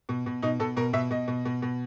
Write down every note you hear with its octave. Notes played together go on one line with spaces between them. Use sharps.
B2
B2
B2 D#4
B2 A4
B2 A#4
B2 E5
B2 D#5
B2
B2
B2